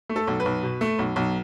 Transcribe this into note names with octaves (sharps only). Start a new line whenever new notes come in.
A3
A4
B1
B4
B1
B2
A3
B1
B1